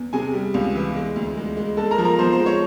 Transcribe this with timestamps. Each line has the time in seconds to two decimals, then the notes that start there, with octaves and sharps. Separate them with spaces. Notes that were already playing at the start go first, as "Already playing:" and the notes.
Already playing: E2
0.13 C3 G#4 G#5
0.34 G3
0.54 C#2
0.75 E3
0.96 G#3
1.16 D2
1.37 G#3
1.57 G#3
1.77 G#3 A4 A5
1.91 A#4 A#5
1.98 F3
2.04 A#4 A#5
2.18 F3 C5 C6
2.32 C5 C6
2.40 G#3
2.46 C#5 C#6